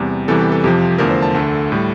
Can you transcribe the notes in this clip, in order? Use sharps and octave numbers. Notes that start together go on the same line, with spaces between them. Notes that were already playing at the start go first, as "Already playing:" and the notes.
Already playing: E2 C3 G3
E2 C3 E3 G3 A4
G4
A4
F2 C3 F3 G4
E2 D3 F3 A3 A#4
C5
A5
D2 D3 A3
A2 G3